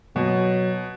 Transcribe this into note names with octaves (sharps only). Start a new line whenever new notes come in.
B2 F#3